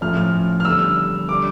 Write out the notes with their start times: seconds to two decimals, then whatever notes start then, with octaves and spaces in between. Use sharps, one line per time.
0.01 A2 F3 C#4 F6
0.17 F6
0.60 F6
0.65 E2 D3 G3 E6
1.28 D3 G3 D4 D6